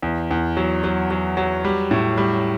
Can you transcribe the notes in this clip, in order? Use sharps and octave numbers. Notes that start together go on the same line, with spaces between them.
E2
E2
F#3
F#3
F#3
F#3
G3
A2
G3